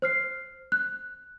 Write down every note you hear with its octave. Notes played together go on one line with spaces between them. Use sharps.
C5 F6 C7
F#6